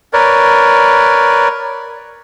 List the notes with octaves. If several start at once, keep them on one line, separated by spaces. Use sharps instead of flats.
A#4 B4 C#5 D5